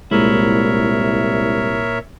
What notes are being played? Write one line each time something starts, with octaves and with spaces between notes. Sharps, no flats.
C2 A#2 G#3 E4 A#4 C#5 E5